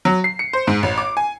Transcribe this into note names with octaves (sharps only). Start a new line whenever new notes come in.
F#3
C7
C#7
C5
G#2
A1
D6
G#5